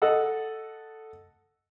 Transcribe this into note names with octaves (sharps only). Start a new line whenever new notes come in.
A4 D#5 F#5 E6